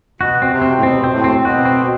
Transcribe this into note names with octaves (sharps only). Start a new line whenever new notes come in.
B2 F#4
C4
C3
C4
A2
B2 C4
C4
A2
C4
B2 F#4
C4